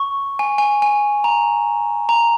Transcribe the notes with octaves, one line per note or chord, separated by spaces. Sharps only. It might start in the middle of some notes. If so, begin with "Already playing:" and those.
Already playing: C#6
G#5
G#5
G#5
A#5
A#5